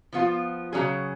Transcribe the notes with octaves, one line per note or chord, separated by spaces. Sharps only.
F3 B3 F4
C#3 F#3 C#4 G#4